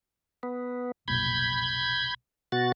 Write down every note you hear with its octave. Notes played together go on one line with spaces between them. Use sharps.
B3
F1 B1 A#2 B5 G6 G#6
B2 F#4 A6